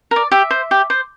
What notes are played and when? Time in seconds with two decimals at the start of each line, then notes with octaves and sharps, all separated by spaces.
0.11 A#4 D5
0.31 G4 E5
0.51 C5
0.71 G4
0.90 C5